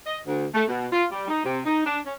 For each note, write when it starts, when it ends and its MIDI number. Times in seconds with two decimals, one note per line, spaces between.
0.06 0.19 75
0.26 0.45 38
0.55 0.63 57
0.68 0.86 47
0.92 1.05 65
1.11 1.24 55
1.28 1.40 63
1.44 1.61 48
1.66 1.84 63
1.85 1.98 62
2.05 2.14 61